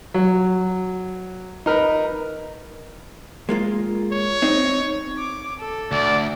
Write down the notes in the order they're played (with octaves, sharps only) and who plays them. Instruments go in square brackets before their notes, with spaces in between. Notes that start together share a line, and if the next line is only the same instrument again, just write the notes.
[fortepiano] F#3
D#4 A#4 B4
[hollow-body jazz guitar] G#3 A#3 F4
[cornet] C#5
[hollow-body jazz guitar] C4 D#4
[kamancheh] D6
A4
[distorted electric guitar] D2 [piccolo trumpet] D5